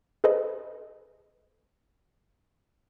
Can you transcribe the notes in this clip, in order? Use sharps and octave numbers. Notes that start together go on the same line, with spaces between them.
G#4 A4 B4 C5 D#5